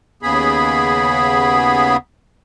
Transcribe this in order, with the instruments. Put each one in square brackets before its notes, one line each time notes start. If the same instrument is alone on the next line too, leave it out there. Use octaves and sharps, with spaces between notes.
[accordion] D#2 C#3 B3 G#4 B5